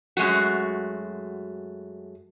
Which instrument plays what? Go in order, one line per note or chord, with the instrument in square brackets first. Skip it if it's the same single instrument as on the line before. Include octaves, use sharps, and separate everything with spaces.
[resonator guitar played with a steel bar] F#2 G#3 A3 F#4